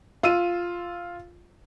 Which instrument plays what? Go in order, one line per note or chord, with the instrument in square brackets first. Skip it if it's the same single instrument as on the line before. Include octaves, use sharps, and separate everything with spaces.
[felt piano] F4 E6 D#7